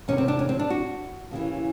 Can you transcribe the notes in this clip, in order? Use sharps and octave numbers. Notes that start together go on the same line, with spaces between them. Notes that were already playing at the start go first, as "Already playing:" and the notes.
E2 C3 D#3 C#4
C4
D4
C#4
C4
D4
F#4
D#2 C#3 E3